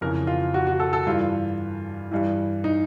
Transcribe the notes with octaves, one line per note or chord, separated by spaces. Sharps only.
F2 C#3 E3 A#4
F4
F#4
F#4
A4
A4
G2 E3 F4
G2 E3
D#4